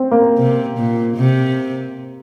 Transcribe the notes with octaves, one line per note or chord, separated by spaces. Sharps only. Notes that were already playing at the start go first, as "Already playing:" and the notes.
Already playing: C4
A#3
C3
A#2
C3